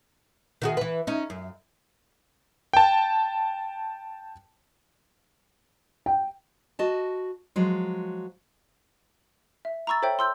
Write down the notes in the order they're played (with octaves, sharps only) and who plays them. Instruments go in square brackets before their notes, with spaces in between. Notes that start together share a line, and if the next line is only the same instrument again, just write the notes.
[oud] D#3 F#4 G#4
E3 B4
C#4 D#4
F#2
[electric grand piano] G5 A5
[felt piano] G5
[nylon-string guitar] F#4 D#5 A5
F3 F#3 G#3
[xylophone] E5
A#5 B5 C#6 E6 A6
A4 C5 C#5 E5 G5
C6 E6 G6